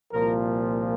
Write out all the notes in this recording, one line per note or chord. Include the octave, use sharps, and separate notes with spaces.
C2 A#2 F3 A#3 A#4